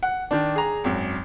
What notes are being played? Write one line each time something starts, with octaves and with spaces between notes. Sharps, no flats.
F#5
D#3 D4
G#4 A#5
G#1 F#2